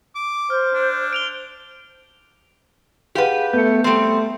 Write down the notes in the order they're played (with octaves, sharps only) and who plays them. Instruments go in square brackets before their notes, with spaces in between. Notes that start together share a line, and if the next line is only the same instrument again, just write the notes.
[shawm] D6
[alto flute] C5 [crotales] F6
[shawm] D4
[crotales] D7 F7 G7
[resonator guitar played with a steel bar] G4 B4 [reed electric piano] G#4 F5 F#5
[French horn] A3 [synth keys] B3 C#7 [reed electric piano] G6
[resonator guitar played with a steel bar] G3 C4 [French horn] A3